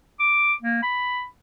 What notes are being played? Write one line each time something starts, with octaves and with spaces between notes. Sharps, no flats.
D6
A#3
B5